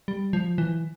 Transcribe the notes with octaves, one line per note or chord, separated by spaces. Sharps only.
G3
F3
E3